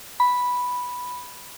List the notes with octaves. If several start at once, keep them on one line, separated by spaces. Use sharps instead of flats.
B5